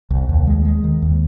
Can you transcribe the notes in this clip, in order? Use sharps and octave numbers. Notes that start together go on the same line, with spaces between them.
C2
D#2
G#3
G#3
D#3
D#2